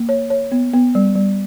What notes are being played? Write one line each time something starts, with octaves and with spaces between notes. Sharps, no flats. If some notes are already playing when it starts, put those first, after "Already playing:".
Already playing: A#3
C#5
C#5
B3
B3
G3
G3